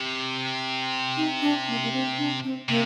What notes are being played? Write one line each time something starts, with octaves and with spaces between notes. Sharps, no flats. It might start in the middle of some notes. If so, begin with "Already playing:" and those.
Already playing: C3
D#4
D4
A#3
A#3
C4
D4
C4
C3 A#3